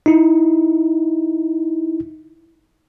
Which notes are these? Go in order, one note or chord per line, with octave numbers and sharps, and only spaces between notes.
D#4 E4